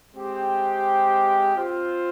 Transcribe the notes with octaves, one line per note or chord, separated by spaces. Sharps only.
G#3 C4 G4
C4 F4 C5